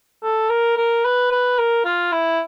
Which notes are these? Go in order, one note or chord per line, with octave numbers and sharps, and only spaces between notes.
A4
A#4
A#4
B4
B4
A#4
F4
E4